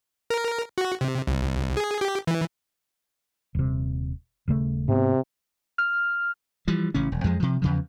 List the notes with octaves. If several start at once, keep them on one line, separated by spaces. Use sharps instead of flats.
A#4
F#4
C3
C2
G#4
G4
E3
D#1 C3
D#1 C#3 A3
G#2 C3 B3
F6
E3 F3 G3
A1 C#3 C#4
E1
F2 F3 G#3
C3 F3
E2 C#3 F3